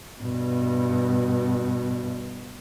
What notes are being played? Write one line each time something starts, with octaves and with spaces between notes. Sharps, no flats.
G2 B2